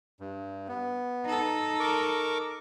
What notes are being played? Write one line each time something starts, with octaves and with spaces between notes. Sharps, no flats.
G2
B3
D#4 A4
A#4 C#6 D6